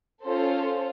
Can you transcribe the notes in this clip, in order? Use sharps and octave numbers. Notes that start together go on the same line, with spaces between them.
C#4 F4 A4 C5